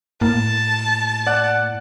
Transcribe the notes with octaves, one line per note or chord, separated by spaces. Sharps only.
A2 A#3 A5
D5 F#5 F#6